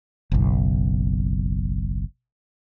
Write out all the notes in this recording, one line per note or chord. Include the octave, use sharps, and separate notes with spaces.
F#1 B1